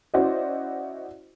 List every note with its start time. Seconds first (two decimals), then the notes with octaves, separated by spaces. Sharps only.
0.14 C#4 E4 F#4 C5 D5 D#5